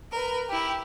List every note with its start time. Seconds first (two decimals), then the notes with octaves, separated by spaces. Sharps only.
0.12 A#4 B4
0.48 E4 G4